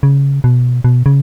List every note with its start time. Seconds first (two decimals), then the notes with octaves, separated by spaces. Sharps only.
0.03 C#3
0.44 B2
0.84 B2
1.06 C#3